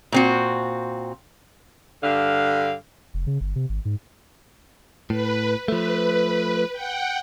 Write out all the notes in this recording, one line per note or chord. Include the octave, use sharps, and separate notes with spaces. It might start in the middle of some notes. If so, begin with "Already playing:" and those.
A#2 C4 F#4
G2 D3 F5
F1
C#3
G1
C3
G#1
G#2
A2 B4
F3 A3 B4
F#5 G5